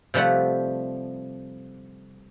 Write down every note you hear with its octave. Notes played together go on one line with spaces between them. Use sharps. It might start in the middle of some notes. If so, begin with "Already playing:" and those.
C3 F3 G3 A3 F#5